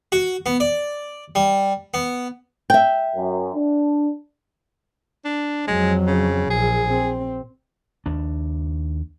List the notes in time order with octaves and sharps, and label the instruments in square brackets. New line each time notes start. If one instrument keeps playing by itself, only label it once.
[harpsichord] F#4
B3
D5
G3
B3
[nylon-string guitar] E5 G5
[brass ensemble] F#2
D4
[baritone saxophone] D4
[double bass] F2 F#3 [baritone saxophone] G#3
[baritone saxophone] C#3
[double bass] A#1 [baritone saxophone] G#4
[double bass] C4
[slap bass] D#2 D4